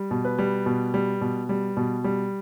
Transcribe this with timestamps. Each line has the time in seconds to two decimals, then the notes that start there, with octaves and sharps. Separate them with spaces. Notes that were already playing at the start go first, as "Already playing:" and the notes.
Already playing: G3
0.11 B2
0.25 B4
0.39 G3
0.66 B2
0.94 G3
1.21 B2
1.49 G3
1.77 B2
2.04 G3